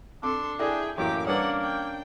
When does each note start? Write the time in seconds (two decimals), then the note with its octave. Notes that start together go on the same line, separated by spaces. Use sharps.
0.23 C4 D4 A4 C6 D6
0.59 E4 G#4 A4 D5 G5
0.98 F#2 A2 E3 F#3 A#3 G4 D6
1.27 G3 A#3 C#4 D4 A#4 B4 F#5
1.61 G5